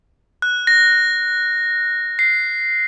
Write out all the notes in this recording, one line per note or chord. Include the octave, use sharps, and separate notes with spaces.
F#6
A#6
C7